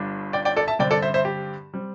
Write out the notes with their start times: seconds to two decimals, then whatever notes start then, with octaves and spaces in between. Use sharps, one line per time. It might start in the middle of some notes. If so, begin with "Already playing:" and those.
Already playing: G1 G2 G3 D4
0.33 D5 G5
0.45 D5 G5
0.56 A4 D5
0.68 E5 A5
0.79 G2 D3 C4 D5 G5
0.91 A4 D5
1.02 C5 E5
1.14 C5 E5
1.25 G4
1.74 G3 C4